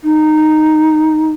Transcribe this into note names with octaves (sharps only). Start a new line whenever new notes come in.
D#4